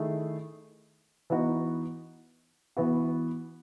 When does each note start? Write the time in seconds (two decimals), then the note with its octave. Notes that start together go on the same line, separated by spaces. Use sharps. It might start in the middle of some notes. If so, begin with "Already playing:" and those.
Already playing: D#3 A3 E4 G#4
1.30 E3 B3 D#4 F#4
2.77 E3 B3 F#4